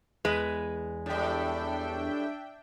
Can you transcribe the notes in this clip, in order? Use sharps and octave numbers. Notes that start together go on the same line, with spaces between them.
E2 G#3 B4
A2 G3 D4 E5 G5